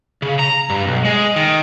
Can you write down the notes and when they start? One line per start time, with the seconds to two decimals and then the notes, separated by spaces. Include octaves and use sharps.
0.22 C#3
0.39 A#5
0.70 G2
0.87 B1
1.05 G#3
1.36 D#3